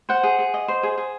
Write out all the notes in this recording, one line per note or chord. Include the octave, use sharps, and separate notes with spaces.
C5 F#5
G#4
G#4
D#5
C5
G#4
G#4